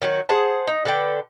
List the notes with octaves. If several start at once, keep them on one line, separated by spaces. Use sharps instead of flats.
D#3 F#3 F#4
G#4 C5 F#5 A5
D#4
D3 A4 B4 G5